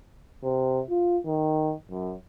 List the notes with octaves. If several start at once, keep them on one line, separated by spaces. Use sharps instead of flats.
C3
F4
D#3
F#2